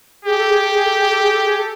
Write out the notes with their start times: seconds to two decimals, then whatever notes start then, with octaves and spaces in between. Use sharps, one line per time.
0.25 G4 G#4
0.37 A4
0.48 G#4
0.61 A4
0.72 G#4
0.84 A4
0.97 G#4
1.09 A4
1.20 G#4
1.32 A4
1.45 G#4
1.57 A4